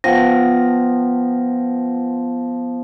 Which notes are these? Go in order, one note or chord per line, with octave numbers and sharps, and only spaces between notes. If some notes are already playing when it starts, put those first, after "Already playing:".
F3 B3 B4 F#5 G5 A#6